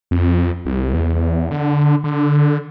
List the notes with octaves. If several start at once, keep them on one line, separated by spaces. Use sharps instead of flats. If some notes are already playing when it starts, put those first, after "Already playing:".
F2
C2
E2
D3
D3